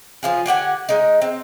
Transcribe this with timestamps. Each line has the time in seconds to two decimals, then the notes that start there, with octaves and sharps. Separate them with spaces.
0.23 F3 F4 G#4
0.46 D3 G4 F#5 G#5
0.89 G#3 D#4
1.22 C4